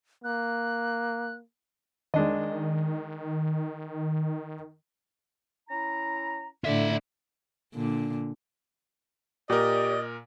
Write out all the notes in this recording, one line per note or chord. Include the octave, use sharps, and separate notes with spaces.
A#3 F#6
D#3 G#3 D4 D#5
C#4 E4 A#5
A2 D3 F4 E5
A#2 D3
A#2 G4 A#4 D5 D#5